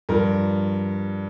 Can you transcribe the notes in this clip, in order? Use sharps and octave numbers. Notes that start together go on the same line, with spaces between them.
G2 F3 A#4